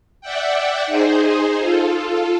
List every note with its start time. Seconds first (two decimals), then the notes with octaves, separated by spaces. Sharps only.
0.21 D5 E5 F#5 G5
0.87 D#4 G#4 C5
1.59 F4 A4